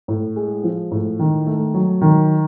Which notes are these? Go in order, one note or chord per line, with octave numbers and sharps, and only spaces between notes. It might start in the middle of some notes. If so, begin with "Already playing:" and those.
A2
G#3
F3
A2
D#3
A3
F#3
D#3